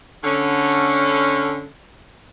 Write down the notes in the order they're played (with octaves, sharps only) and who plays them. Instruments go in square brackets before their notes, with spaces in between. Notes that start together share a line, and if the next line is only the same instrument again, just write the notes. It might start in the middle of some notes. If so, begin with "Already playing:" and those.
[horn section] D3 C#4